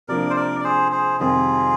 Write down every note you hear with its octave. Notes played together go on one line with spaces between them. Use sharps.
C3 F3 A#3 D4 A#4 D5
C5
A#4 D5
D5
G#4 C5
G#4 C5
F2 C3 D#3 G3 F4 G#4